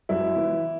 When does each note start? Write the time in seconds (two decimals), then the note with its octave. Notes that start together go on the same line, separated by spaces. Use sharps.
0.09 F#2 E4
0.37 E3